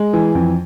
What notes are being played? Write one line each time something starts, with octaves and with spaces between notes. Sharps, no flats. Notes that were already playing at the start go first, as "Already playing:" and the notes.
Already playing: G#3
E3
F2